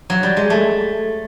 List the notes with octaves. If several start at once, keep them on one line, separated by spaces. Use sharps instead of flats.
F#3
G3
G#3
A3